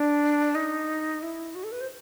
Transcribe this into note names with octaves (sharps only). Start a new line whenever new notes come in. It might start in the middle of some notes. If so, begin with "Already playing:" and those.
Already playing: D4
D#4
E4
F#4
A4
B4
C5